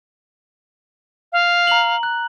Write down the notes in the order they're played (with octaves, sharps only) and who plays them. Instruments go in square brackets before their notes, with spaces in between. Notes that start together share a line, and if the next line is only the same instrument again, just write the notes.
[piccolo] F5
[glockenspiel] A#5 F#7
F#6